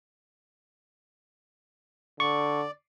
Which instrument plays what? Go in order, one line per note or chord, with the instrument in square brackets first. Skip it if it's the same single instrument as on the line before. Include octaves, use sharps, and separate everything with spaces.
[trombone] D3 [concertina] D5 [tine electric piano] C#6